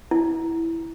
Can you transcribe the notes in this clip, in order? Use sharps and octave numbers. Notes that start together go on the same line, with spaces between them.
E4